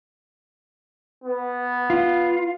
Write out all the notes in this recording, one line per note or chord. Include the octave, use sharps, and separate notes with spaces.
B3
F4